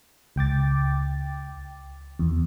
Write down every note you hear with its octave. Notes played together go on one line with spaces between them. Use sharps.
C#2 G5 D6 A6
E2